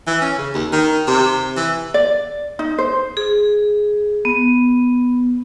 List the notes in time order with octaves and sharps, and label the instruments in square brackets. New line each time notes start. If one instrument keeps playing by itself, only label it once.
[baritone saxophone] E3
C#4
C#3
D#2
D#3
C3
E3
[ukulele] D5
D#4
C5
[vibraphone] G#4
B3